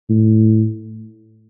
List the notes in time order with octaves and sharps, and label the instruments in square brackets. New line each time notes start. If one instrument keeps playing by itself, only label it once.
[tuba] A2